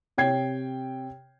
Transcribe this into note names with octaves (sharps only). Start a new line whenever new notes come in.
C3 C#5 G5 G#6 C7